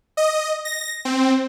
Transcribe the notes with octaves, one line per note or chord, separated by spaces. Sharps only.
D#5
A#6
C4